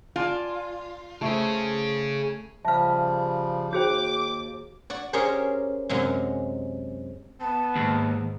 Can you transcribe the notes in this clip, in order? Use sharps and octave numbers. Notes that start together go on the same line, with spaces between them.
F4 D5 G#5 A5
C#3 A3 C#4 C5
C#3 F3 G3 E5 F5 A5 F6
D#2 F#4 G#4 C5 G5 D6 G6
F#4 D5
C#4 G4 G#4 A#4 C5
F#2 C3 F#3 G#3
B3 A5
D#2 G#2